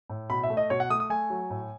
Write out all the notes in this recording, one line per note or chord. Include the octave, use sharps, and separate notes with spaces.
A2
B2 B5
E5
A3
D#5
B2 C#5
F#5
A3 D#6
D#6
A3 G#5
F#3
A2